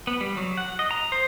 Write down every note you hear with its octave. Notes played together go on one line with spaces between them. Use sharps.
B3
G3
F#3
F#5
D#5
A#5
C5